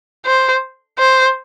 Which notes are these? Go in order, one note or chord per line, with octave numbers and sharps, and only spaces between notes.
C5
C5